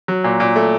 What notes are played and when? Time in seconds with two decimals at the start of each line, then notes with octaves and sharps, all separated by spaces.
0.08 F#3
0.24 A#2
0.40 A#2
0.56 A3